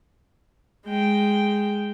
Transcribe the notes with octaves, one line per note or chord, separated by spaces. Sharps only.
G#3 G5